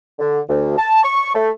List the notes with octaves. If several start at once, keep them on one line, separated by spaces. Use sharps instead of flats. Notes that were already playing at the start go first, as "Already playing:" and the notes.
D3
D2
A5
C#6
A3